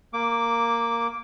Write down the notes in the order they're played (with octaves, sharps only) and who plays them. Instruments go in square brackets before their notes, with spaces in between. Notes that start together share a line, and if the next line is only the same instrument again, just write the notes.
[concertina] A#3 D6